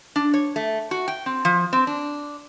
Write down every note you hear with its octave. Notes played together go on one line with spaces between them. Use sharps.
D4
C#5
A3
F#4
G5
C4
F3
C4
D4